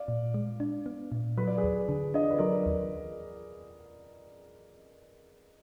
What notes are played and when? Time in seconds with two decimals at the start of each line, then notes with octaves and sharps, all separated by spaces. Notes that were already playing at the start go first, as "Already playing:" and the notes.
Already playing: D5 F5
0.08 A#2
0.34 G#3
0.60 D4
0.86 B3
1.12 A#2
1.38 F#3 B4
1.47 D5
1.58 G#4 B4
1.63 D#2
1.89 D3
2.14 D4 D#5
2.22 D5
2.30 B4
2.38 F#3 A#4 D5
2.66 D#2